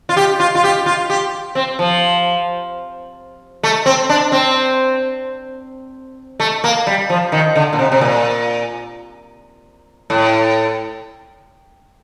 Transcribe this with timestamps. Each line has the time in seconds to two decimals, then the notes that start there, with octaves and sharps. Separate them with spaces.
0.09 F4
0.17 G4
0.40 F4
0.55 F4
0.64 G4
0.86 F4
1.10 G4
1.55 C4
1.79 F3
3.63 A3
3.86 C4
4.09 D4
4.32 C4
6.40 A3
6.64 A#3
6.87 G3
7.09 F3
7.32 D#3
7.56 D3
7.73 A#2
7.79 C3
7.92 C3
8.01 A#2
10.10 A2